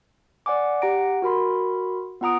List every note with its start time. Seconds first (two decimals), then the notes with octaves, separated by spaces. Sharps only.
0.46 D5 F#5 G#5 D6
0.82 G4 F#5 A#5 A#6 D7
1.22 F#4 A#4 B5 C6
2.21 B3 F4 F#5 A#5 D#6 D7